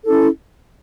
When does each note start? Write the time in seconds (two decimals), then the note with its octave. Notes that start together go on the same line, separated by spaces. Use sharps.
0.06 C#4 E4 A4